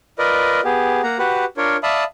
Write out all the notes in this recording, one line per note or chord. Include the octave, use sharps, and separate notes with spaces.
F4 A#4 B4 D5 D#5
B3 G4 G#4
A#3 F#5 A#5
F#4 G4 B4 F#5
D4 F4 A#4 C#5
D5 E5 F5 A5 B5 D#6